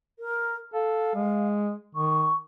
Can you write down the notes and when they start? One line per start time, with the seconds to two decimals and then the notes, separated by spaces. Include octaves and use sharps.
0.19 A#4
0.74 A4 F5
1.15 G#3
1.95 D#3 C#6